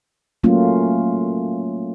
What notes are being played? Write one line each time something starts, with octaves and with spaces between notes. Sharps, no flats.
F#3 A3 A#3 C#4 F4